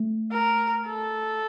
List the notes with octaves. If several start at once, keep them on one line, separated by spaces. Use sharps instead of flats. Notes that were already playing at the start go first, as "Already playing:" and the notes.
Already playing: A3
A#4
A4